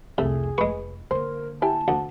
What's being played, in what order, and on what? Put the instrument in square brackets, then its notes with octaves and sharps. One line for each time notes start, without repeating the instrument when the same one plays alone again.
[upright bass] C2 F2 [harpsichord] C3 [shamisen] A3 [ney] G#4
[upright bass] F1 [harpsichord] G#3 C#6 [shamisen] B4
[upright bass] D3 A#3 [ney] A#4 [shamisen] C5
[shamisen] E4 G4 G#5 [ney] A5
[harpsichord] D2 [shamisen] F#5